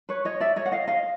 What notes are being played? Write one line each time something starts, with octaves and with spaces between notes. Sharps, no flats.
B4 C#5
C#5 D#5
D5 E5
C#5 D#5
F#5
D#5 F5
D#5 F5